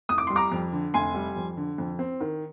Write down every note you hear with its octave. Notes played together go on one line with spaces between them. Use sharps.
F1 D#6
D6
G3 C6
A#5 D6
F2
D3
F1 G#5 C6
G3
F2
D3
F2
C4
D#3